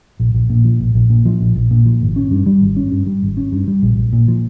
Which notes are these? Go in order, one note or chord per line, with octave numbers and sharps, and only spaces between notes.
A#1
A#1
A#2
F3
A#1
A#1
A#2
F3
A#1
A#1
A#2
F3
G#1
C#4
G2
G3
G#1
C#4
G2
G3
G#1
C#4
G2
G3
A#1
A#1
A#2
F3